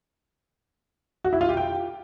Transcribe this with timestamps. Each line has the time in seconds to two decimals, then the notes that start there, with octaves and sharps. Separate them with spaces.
1.24 F#4
1.33 E4
1.41 F4
1.49 G4
1.57 G5